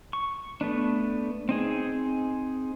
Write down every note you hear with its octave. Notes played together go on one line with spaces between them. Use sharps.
C#6
A3 B3 D4
C4 D#4 G#4